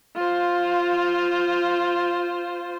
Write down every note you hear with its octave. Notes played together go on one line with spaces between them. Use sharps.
F4 C5